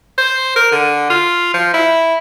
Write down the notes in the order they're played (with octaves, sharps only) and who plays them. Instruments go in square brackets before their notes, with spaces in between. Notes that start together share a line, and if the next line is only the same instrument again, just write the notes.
[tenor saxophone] C5
A#4
D3
F4
F3
E4